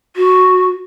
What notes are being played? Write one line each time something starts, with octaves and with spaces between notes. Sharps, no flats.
F#4